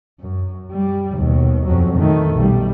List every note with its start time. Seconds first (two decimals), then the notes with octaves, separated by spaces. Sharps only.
0.20 F#2
0.72 G3
1.15 D#2 B2
1.67 F2 F#3
1.97 D#3 A3
2.35 B1 G3